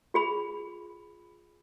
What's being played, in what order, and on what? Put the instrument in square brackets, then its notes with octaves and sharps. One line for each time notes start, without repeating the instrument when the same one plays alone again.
[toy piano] F4 G#4 B5